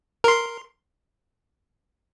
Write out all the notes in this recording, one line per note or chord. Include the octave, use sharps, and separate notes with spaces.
A#4 C6